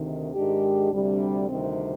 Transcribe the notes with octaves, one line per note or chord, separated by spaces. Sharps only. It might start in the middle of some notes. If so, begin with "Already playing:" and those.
Already playing: D2 C3 D#3
G#2 D#3 G#3 D4 G4
D2 C3 G3 D4
D2 C3 D#3 G3 C4